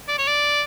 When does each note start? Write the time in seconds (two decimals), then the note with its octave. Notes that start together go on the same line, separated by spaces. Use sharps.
0.08 D5
0.18 C#5
0.27 D5